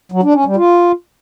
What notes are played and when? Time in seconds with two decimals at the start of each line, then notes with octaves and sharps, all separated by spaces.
0.12 F#3
0.23 D4
0.34 C#4
0.45 G3
0.56 F4